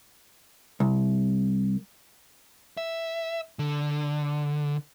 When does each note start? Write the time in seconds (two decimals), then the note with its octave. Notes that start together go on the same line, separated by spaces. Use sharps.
0.80 C2
2.77 E5
3.59 D3